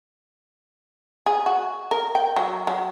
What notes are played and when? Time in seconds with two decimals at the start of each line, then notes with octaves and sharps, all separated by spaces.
1.26 G#4
1.46 F#4
1.91 A#4
2.15 G5
2.36 F#3
2.67 F#3